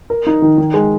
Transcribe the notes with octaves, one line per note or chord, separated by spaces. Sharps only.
A#4
D#4
D#3
D#3
G#3